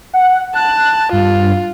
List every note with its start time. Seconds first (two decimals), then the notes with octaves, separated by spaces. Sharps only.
0.13 F#5
0.55 A5 F#6
1.13 G2 F4